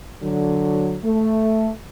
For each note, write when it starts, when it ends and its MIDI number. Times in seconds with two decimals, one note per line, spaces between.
0.23 0.98 50
0.23 0.98 54
1.04 1.71 57